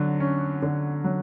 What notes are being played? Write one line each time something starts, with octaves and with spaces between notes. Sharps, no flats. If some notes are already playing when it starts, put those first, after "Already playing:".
Already playing: D3 F#3
C#4
D3
F#3